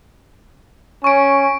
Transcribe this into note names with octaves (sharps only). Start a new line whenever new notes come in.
C#4 C#6 D7